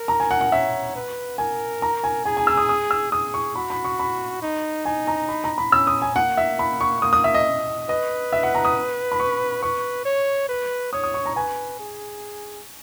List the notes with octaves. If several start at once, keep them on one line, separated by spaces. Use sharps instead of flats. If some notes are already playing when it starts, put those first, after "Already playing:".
Already playing: A#4
A#5
G#5
F#5
F#5
C#5 E5
B4
A#4 G#5
A#5
G#5
G#4 G#5
G#5
E6
D#6
D#6
E6
G#4 D#6
C#6
F#4 B5
B5
C#6
B5
D#4
D#4 G#5
A#5
B5
A#5
B5
C#4 E6
D#6
G#5
A#3 F#5
E5
B5
C#6
A#3 D#6
D#6
E5
D#5
B4 D#5
E5
F#5
A#5
D#6
B5
C#6
B4 C#6
C#5
B4
C#5 D#6
D#6
C#6
A#5
B4 G#5
G#4